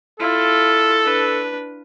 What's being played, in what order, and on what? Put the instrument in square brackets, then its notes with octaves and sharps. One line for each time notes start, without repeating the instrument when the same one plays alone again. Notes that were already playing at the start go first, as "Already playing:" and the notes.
[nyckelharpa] E4 F4 [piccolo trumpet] A4
[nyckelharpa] D4 B4